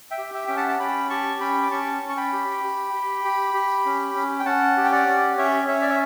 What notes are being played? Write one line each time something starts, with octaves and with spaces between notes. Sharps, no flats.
E5 G5
G4
E5 G5
C#4 G5
F#5 A5
A5
C#4 G5 B5
G4 A5 C#6
C#4 G5 B5
D6
C#4 A5 C#6
C#4
C#6
G5 B5
G4
G4
G4
G4
G4
C#4
C#4
G5
C#4 F#5 A5
G4
G5
D5 F#5
C#4
C#4 C#5 E5
C#4 C#5 E5
D5
E5